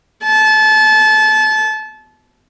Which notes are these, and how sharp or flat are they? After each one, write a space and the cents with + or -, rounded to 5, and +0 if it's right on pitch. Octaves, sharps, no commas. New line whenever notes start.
A5 -25